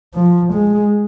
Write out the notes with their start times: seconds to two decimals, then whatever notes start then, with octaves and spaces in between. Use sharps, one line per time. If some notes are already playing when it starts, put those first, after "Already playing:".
0.15 F3
0.54 G#3